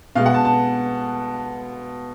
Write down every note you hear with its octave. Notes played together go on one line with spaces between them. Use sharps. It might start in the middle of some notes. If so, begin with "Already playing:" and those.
B2 G#3 F5
F#5
A5
A5